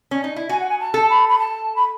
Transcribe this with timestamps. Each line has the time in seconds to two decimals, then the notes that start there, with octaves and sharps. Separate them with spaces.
0.11 C#4
0.24 D#4
0.36 E4
0.49 F#4 G#5
0.60 F#5
0.69 G#5
0.80 A5
0.94 A4
1.09 B5
1.29 B5
1.39 A5
1.76 B5